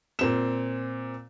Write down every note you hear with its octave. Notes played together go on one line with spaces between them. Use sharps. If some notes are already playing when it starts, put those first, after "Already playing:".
A#2 C4 E7